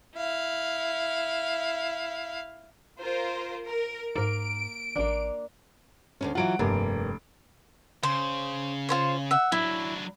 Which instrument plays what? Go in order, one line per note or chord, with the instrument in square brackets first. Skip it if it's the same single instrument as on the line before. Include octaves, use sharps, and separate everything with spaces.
[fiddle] E4 F5
[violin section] F4 A#4 C5
A#4
[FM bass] G#2 [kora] A#3 A#4 [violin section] D7
[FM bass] A1 [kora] A#3 D4
[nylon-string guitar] D2 G#2 C#4
[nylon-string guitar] E3 F#3 F4 [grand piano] F#5 D7
[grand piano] F1 [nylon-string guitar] G2 A#3
[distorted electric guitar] C#3 [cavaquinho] C5
[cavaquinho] F4 C5 C#5
E5 F#5
[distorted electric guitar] F#3 D4 [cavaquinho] E4